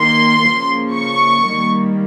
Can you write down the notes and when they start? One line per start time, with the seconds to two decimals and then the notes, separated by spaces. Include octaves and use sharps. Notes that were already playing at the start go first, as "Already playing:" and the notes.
Already playing: D#3 A#3 C6
0.43 C#3 F3 A#3
0.93 C#6
1.44 D#3 G3 A#3